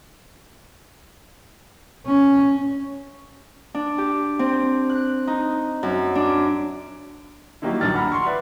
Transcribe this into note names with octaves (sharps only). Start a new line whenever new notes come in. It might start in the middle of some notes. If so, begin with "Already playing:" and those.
C#4
D4
G4
C4
F#6
D#4
F#2
D4
D#3 F#3 G3 A#3 D#4 E4
D#1 A#1 F#3 D4 F6 A6
F#5 A#5 B5 F6
C6 C#6
B4 D5 E5